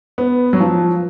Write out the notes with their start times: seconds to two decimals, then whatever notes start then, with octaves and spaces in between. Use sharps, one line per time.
0.18 B3
0.53 F#3
0.60 F3